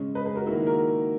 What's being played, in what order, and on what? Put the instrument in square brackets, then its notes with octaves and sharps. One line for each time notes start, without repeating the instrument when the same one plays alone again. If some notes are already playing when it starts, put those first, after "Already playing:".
Already playing: [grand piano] C#3 G#3 C#4
[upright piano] B4 D#5
G#4 B4
F#4 A#4
[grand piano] D#3 A#3 E4 [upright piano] F#4
[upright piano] G#4
F#4 A#4